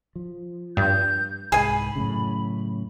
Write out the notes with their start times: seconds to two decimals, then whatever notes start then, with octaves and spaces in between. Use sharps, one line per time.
0.16 F3
0.77 G2 G6
1.52 C2 G#2 G#4 G#5 B5
1.96 F#2 A2 C#3